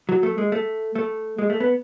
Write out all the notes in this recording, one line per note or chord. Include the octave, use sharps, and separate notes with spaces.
F#3
A3
G#3
A3
A3
G#3
A3
B3